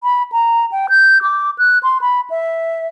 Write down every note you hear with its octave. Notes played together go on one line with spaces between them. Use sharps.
B5
A#5
G5
G6
D6
F#6
C6
B5
E5